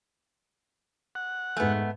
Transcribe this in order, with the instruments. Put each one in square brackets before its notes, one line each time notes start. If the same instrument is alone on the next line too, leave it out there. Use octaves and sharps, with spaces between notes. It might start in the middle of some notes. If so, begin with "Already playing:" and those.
[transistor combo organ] F#5
[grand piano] G#2 G#5 [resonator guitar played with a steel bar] A3 B3